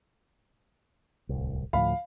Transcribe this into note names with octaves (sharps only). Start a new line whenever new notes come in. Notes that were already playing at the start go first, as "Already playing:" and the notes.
D1 C2
D2 A2 F3 F5 B5